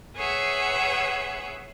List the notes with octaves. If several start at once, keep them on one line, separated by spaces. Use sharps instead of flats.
G#4 B4 C#5 E5 F#5